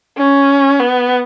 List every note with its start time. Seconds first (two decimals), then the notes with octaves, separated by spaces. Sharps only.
0.18 C#4
0.80 B3